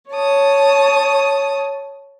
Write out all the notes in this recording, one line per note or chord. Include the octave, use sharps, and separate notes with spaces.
C#5 A5 D#6